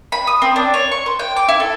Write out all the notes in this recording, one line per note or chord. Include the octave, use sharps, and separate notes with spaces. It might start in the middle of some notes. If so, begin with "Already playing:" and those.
B5
D#6
C4
D4
C#5
C#6
C5
G5
D6
E4
A4